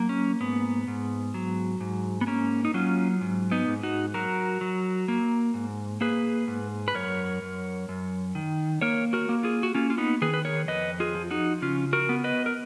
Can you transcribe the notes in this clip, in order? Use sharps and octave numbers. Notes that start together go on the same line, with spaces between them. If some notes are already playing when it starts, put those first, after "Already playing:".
Already playing: F#3 A#3
C#4
G#2 B3
G#2
F#3
G#2
B3
A#3 C#4
D#4
F#3 C#4 F4
G#2
B3 D#4
G#2
D#4 F#4
F#3 F#4 A#4
F#3
A#3
G#2
A#3 G#4 B4
G#2
B4
F#2 A#4 C#5
F#2
F#2
D#3
A#3 A#4 C#5
F#4 A#4
A#3
F4 G#4
F#4
A#3 C#4 F4
F4
B3 D#4
D#3 G#4 B4
B4
A#4 C#5
F2 B4 D#5
F4 G#4
F3
D#4 F#4
C#3 C#4 F4
F#4 A#4
B3
B4 D#5
A#4